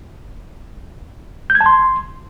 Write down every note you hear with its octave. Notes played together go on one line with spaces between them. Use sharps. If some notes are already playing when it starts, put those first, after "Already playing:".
G6
G#6
A5
C6